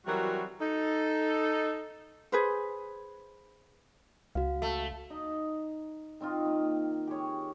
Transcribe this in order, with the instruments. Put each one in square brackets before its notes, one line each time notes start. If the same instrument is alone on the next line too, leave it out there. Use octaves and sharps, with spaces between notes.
[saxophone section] E3 F#3 G3 C4 F#4 A#4
D#4 A4
[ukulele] G#4 B4 C5
[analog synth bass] C#2 [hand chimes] F#4 F5
[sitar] A3
[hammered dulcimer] D#4
D#3 C4 D#4 F4
A#3
G4 G#4 C#5